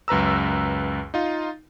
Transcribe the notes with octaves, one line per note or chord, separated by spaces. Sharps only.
C#2 F#2 B4 A#5 E6
D#4 F4